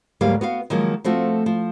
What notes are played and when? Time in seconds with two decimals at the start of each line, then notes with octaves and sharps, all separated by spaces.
0.21 D2 G#2 F#3 G3 A#3 F5
0.41 B3 F#4 F5
0.70 D#3 F3 F#3 G#3 A#3
1.04 F3 A3 C4 F4 F#4
1.46 F3